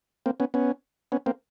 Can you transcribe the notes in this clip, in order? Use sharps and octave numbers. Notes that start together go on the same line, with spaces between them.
A#3 C4
B3 C#4
B3 C#4
B3 C#4
A#3 C4